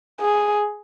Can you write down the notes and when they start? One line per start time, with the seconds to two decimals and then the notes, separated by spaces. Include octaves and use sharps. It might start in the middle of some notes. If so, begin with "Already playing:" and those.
0.21 G#4